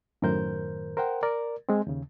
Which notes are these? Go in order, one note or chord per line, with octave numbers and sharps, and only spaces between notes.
F#2 A2 D#3 A#4 C5 G6
A#4 C5 F#5 G5
A#4 D5
G#3 C4
D#2 C#3